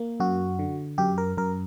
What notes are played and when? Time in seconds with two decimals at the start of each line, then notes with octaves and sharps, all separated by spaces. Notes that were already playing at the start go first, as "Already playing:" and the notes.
Already playing: A#3
0.20 F#2 F#4
0.59 D3
0.98 F#2 G4
1.18 A#4
1.37 F#2 A#4